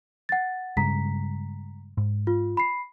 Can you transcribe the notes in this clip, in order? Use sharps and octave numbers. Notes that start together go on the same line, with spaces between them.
F#5 A6
G2 C#3 G#3 A#5 B6
G#2
F4
B5 C7